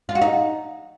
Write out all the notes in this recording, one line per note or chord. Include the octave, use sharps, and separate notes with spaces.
F4
F#4
D#4